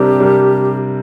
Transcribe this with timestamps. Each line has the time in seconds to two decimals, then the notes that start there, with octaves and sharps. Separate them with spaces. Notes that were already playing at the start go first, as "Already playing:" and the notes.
Already playing: C3 G3 D4 G4 A#4
0.20 C3 G3 D4 A#4